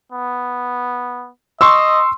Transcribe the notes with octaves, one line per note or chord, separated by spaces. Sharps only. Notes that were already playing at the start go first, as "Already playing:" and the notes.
B3
D#5 C6 C#6 E6